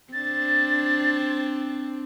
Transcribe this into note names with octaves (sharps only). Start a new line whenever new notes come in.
C4 D4 A6